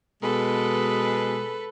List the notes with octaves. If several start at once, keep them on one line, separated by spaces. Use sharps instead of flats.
B2 G#3 A4 B4